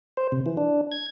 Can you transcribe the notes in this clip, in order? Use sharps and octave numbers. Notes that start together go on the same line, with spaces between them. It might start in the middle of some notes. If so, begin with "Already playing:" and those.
C5
C3
E3
D4
G#6